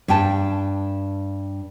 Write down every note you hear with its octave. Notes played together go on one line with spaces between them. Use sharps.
G2 G3 G5 A5